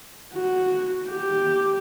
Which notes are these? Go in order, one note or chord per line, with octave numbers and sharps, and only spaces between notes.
F#4
G4